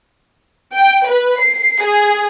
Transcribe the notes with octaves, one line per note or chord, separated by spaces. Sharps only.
G5
B4
C7
G#4